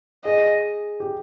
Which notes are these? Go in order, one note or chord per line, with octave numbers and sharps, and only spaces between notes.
G#4 D#5
G4